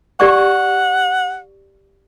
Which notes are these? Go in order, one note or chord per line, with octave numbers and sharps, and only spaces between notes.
G4 D5 F#5 C#6